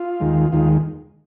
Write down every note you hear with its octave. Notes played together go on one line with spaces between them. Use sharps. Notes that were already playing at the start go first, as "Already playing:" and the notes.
Already playing: F4
D#2 D#3 G#3
D#2 D#3 G#3 F4